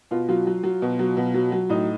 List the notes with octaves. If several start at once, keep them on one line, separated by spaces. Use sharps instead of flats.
B2 F4
F#3 F4
F#3
F#3
B2
F#3
B2
F#3
F#3
A2 D#4